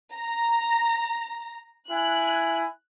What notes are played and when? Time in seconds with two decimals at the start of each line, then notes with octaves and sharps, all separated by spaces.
0.14 A#5
1.91 E4 G#5 F#6